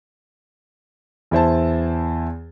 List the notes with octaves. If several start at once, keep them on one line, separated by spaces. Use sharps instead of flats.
E2 E4 C5 A5